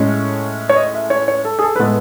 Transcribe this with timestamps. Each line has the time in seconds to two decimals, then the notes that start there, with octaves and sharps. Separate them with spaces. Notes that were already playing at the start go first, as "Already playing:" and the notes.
Already playing: A2 G#3 C#4 C#5
0.69 C#5
0.76 D#5
0.94 E5
1.10 C#5
1.28 C#5
1.45 A4
1.59 G#4
1.62 A4
1.76 B4
1.79 A2 G#3 B3 A4